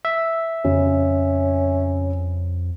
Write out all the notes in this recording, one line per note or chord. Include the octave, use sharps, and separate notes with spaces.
E5
F2 C#3 C#4